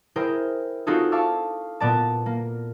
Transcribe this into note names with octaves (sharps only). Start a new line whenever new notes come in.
E4 G#4 A#4 C5 G5
C4 D#4 F4 F#4 G#4 A4
F5 A5 C#6 D6 E6
A#2 B3 D5 A5
A#3